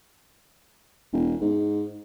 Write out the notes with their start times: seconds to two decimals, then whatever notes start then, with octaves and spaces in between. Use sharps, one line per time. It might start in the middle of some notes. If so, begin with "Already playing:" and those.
1.13 E1
1.42 G#2